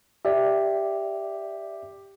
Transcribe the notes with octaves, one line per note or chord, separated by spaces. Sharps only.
G4 D5 E5